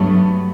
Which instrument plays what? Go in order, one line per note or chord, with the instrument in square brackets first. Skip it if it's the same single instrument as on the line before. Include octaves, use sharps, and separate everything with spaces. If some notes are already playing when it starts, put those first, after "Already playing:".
Already playing: [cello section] G2 F#3 A3 B3